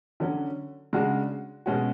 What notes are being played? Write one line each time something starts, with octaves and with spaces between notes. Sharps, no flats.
D3 F#3 C#4 F#4
C#3 G#3 D4 F#4
B2 G#3 C#4 F#4